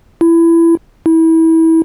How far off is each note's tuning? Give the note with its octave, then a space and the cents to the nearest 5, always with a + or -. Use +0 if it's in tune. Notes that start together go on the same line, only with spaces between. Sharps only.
E4 +20
E4 -25